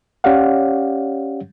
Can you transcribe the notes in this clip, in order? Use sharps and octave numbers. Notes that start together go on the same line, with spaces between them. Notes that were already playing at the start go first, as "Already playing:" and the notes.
C#4 G4 C#5 D5 F5 F#5